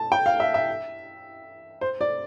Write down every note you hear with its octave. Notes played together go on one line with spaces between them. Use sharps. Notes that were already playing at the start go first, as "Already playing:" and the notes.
Already playing: A5
G5
F5
E5
E5
C5
D5